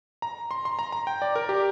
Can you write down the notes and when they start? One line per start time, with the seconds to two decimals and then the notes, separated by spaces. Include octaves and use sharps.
0.22 A#5
0.51 C6
0.65 C6
0.79 A#5
0.93 A#5
1.07 G5
1.22 D5
1.35 A#4
1.49 G4